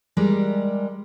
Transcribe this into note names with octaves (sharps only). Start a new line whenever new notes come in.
G3 G#3 A#4 D5